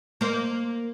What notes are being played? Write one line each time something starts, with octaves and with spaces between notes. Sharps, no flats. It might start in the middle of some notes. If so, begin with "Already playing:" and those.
A#3 C5